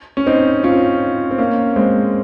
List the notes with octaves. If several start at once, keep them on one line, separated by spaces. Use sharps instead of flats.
C#4
C4 D#4
C#4 F4
C4
A#3 C#4
G#3 C4